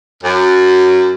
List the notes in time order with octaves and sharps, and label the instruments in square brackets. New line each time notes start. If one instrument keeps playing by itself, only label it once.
[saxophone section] F#2